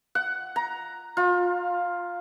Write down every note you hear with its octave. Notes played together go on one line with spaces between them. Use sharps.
F#5
A#5
F4